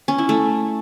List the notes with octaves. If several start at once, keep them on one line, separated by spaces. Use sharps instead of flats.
C#4
E4
A3